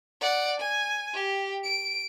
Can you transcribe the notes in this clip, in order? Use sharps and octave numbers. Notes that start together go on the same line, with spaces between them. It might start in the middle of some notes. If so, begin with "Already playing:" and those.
D5 F#5
G#5
G4
D7